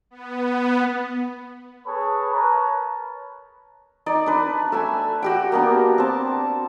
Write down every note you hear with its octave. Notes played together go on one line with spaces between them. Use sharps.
B3
G#4 A4 B4 C#5 A5 B5
A#4 B4 C#5 A5 A#5
D#4 D5
D4 B4
A3 G#5 E6
F#4 G4 G5
A#3 B3 D4
C4 A5